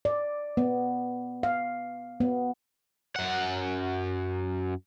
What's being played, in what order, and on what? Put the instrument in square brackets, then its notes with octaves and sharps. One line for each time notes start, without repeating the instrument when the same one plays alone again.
[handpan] D5
B3
F5
B3
[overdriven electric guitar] F#2 F#5